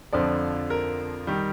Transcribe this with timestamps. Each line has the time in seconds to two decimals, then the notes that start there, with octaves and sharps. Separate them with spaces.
0.13 F2 D3 F3 D5
0.70 A#4
1.27 D#3 G3